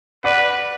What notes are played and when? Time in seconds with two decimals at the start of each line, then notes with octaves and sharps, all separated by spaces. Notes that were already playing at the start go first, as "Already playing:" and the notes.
0.24 B4 D5 F#5